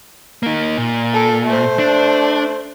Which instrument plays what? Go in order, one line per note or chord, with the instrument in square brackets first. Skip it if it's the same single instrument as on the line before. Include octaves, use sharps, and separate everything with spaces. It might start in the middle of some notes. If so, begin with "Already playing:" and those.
[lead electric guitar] A#3 D#4
A#2
[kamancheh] A4
A3 C5
[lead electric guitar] D4